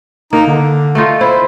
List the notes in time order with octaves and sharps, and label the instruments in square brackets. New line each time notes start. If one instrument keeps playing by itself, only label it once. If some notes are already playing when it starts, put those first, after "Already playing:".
[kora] A#3 [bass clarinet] D#4
[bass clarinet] D3
[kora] A3 D#4 F4
[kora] E4 [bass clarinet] C5